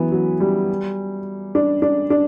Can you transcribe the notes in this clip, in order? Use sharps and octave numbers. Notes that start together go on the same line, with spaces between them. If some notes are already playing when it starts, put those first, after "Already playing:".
Already playing: E3 F#3 B3
F#3
G3
D4
D4
D4